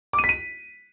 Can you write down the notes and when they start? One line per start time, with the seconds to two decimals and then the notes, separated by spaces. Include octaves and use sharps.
0.13 D6
0.19 D#7
0.24 B6
0.29 D#7